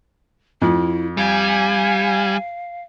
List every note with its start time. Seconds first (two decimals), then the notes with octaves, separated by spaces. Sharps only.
0.62 F2 E4
1.17 G3 F5 G#5